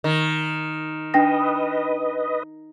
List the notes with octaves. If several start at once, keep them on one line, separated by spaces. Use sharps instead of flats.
D#3
D4 B4 D#5 G5 A#6